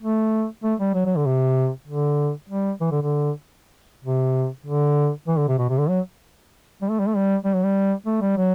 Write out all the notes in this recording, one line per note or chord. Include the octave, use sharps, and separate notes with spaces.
A3
A3
G3
F#3
F#3
D3
C3
D3
G3
E3
D3
D3
C3
D3
E3
D3
C3
B2
C3
D3
F#3
G3
A3
G3
A3
G3
G3
F#3
G3
A3
G3
F#3